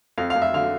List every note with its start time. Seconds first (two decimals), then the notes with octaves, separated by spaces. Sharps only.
0.18 F2 F5
0.30 F5
0.36 F2
0.42 E5
0.54 D3 F5